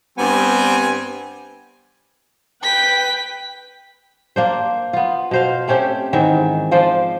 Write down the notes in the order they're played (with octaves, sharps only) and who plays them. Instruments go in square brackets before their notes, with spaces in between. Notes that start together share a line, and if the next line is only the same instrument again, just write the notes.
[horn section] G2 B3 [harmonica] G3 C4 G#5
[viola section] B4 G5 [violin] B6
[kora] A#3 D4 C5
B3 F4
B2 C5 F5
A3 C4 C#4 G4
G#2 D#3 E3 E5
F3 F4 C5 D5